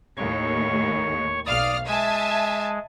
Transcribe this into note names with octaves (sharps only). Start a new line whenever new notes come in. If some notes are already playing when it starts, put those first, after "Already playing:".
D#2 A2 C#5 C#6
B1 D5 F5 D#6 F6
G#3 E5 G#5 A5